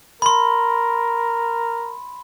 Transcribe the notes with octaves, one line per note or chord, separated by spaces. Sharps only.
A#4 B5 C6